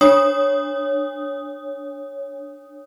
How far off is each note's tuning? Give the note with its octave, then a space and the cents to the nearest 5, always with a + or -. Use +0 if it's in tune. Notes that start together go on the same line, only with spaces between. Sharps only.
D4 +0 C#5 +0 D#6 +0